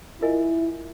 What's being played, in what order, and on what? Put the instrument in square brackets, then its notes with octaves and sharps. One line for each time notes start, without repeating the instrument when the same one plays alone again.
[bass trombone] E4 [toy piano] F4 A#4 D#5 G#5